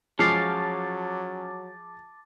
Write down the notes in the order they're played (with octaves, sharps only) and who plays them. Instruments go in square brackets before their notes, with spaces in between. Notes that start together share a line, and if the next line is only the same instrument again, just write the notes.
[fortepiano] F3 G#3 [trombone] F#3 [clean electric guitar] C#4 F5 [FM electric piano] A5 D6 A6